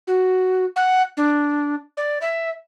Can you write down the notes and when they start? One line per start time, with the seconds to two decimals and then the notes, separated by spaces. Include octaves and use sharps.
0.07 F#4
0.76 F#5
1.17 D4
1.97 D5
2.21 E5